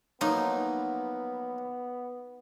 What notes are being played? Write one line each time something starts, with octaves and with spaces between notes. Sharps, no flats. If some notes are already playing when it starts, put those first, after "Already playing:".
F3 F#3 A#3 B3 D#4